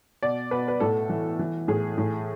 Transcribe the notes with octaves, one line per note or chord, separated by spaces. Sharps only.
B2 D5
B2 B4
B4
A2 A4
E3
E3
A2 G#4
A2